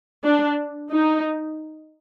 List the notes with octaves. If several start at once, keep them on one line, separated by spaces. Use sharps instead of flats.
D4
D#4